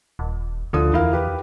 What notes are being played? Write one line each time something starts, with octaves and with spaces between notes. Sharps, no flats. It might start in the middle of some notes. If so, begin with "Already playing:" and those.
D#1
D2 D3 F3 D#6
E2 E4 A#4 F5
G4 B4